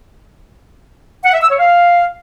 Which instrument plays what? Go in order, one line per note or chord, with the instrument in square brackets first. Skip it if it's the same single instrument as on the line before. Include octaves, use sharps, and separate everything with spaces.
[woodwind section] F#5
E5
E6
C#5
F5